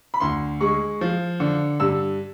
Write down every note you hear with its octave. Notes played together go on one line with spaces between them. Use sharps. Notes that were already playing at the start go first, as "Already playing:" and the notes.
B5
D2 C6
G#3 C#6
F3
D3
G2 E6